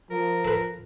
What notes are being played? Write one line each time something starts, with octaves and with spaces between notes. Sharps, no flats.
F3 A#4
A4 B4